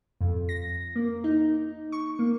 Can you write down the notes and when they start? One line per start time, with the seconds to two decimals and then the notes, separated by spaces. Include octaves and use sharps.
0.21 F2
0.49 A#6
0.96 A#3
1.24 D#4
1.92 C#6
2.19 A#3